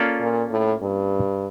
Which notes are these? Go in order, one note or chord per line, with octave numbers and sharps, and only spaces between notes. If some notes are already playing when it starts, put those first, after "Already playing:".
Already playing: A#3 C#4 F4 A4 D5
A#2
A2
G2